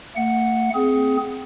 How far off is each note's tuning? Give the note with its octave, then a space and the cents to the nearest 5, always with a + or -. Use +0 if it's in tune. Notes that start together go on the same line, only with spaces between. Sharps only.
A3 +35 F#5 +0
C4 -10 G#4 +15